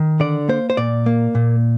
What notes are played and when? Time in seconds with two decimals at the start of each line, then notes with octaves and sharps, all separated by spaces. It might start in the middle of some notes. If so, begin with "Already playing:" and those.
Already playing: D#3
0.20 D3 D5
0.49 A#3 C5
0.70 C5
0.77 A#2 D5
1.06 A#3
1.35 A#2